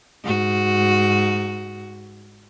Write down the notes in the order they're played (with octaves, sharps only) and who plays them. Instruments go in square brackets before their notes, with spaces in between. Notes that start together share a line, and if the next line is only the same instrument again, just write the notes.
[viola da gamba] G#2 F#4